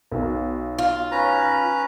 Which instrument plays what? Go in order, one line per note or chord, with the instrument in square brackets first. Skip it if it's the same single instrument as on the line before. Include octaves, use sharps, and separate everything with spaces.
[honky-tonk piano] B1 B2
[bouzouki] F4
[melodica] C#4 B4 A#5